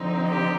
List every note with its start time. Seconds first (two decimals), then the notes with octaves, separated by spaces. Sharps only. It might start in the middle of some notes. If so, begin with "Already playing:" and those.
Already playing: D3 F3 C4 D#4
0.28 G4